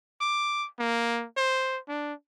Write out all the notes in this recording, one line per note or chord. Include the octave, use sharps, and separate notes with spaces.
D6
A#3
C5
D4